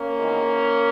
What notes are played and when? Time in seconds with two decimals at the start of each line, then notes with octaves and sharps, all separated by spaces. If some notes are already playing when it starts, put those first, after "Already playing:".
Already playing: A#3 C#4
0.18 E2 D#3 G#3